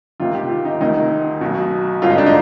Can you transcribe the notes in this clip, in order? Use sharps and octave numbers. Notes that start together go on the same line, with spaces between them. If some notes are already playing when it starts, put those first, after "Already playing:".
D2 C3 D#3 F4
G4
F4
D#4
D2 C3 D#3 D#4
B1 B2
G#1 G2 D3 F4
D#4
D4
D#4